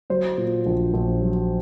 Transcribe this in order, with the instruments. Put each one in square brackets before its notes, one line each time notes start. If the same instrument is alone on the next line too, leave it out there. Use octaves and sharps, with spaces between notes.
[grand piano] F#3 C5
A#2
A#1
A#1
F#3